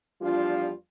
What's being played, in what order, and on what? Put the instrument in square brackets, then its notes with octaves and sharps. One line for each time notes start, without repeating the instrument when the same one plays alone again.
[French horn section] E2 F3 G3 D4 F4